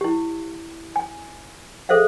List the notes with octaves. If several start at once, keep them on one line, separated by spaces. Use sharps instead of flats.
E4 G4
G#5
G#4 A4 C5 E5 F5